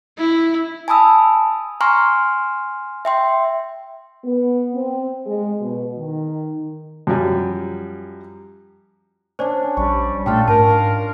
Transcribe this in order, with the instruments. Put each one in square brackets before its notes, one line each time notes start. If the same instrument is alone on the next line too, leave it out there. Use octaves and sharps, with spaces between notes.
[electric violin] E4
[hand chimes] G#5 A5 B5 D#6 E6
G#5 A#5 C6 C#6 F6
E5 G5 C6
[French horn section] B3
C4
G#3
B2
D#3
[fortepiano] F#2 F3 G3 G#5
[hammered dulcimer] C#4 D4 [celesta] C5 D5
[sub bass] A#1 [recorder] G3 [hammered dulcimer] C#6
[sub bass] A#2 [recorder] A3 [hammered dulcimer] D4 F4 [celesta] G5 F6
[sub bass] G#2 [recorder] A#4 [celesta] A5
[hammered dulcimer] F5